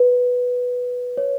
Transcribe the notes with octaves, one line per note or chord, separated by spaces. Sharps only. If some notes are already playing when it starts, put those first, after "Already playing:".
Already playing: B4
C#5